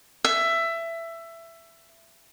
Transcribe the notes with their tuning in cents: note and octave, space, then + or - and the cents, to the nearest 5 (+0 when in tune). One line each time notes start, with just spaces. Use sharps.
E5 +15